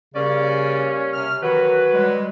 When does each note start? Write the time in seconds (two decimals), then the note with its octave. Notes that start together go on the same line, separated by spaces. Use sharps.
0.15 C#3 G3 A#3 C#4 D5
1.14 C3 F6
1.43 D#3 E3 F#3 F#4 B4
1.93 G3 G#3